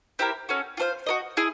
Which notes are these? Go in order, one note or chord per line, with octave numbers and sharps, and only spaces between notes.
C4 E4 G4 A#4
C#4 F#4 A4
F4 A4 C5 F5
F#4 A#4 D#5
E4 G#4